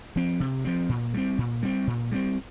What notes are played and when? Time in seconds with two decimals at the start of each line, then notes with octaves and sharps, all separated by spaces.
0.16 F3 C4
0.40 C3
0.65 F3 C4
0.89 A#2
1.14 G3 C4
1.38 A#2
1.63 G3 C4
1.87 A#2
2.12 G3 C4